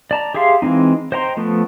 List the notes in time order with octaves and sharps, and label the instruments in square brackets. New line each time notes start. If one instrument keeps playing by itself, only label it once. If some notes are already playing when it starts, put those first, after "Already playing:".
[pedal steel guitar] D5 A5 A#5
G4 G#4 E5 F5 C6
E3 G#3 C4 D#4
C5 D#5 G5 A#5 C6
F3 A3 B3